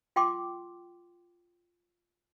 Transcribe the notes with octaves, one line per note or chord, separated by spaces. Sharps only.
F4 G5 C6 D6